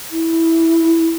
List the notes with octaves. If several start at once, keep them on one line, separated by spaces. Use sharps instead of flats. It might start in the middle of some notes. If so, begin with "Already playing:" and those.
E4